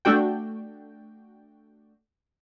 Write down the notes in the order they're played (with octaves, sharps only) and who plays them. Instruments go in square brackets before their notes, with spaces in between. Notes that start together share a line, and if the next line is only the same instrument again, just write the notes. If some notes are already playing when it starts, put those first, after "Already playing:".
[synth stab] A3 D4 F#4 G5